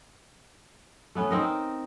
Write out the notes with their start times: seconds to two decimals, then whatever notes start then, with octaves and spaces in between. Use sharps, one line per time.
1.15 A3 B3 C#4
1.31 C4 D#4 A#4